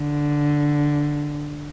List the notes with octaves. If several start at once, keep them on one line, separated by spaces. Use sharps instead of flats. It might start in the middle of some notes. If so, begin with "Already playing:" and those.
Already playing: D3